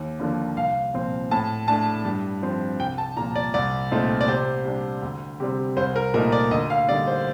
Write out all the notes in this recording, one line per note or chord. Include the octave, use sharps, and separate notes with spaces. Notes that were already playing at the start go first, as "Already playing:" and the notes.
Already playing: D#2
D3 F3 A#3 D4
C2 F5
A#2 F3 C4
A2 A5
A3 D4 A5
G2
F3 C4
C2 G5
A5
A#2 F3 A#5
D5
C2 D5
A#2 A3 C4 D#4
D5
C3 C5
G3 D4
D2
C3 G3 C4
C2 C5
A#4
A#2 A3 D#4 A#4
D5
D2 D#5
F5
D3 G3 A#3 D#4 D5
C5